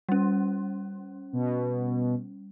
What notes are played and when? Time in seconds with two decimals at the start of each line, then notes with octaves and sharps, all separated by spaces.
0.09 G3 C#4
1.33 B2